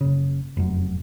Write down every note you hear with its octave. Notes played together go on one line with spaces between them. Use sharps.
F#1 C#3
F1 F#2